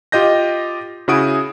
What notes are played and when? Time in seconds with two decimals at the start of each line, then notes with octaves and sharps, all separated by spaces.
0.12 F4 G4 D#5 G6 A#6
1.08 C#3 E4 F#4 G#4 D#6 D7